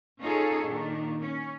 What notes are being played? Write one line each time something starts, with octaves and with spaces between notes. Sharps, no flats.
C#4 D#4 F4 G#4 A4 C#5
A#2 D#3 D4
C#4